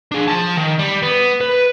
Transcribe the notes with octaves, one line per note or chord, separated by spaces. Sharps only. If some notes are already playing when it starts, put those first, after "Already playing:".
D4 G#4
F3 A5
D#3
G3
B3
B4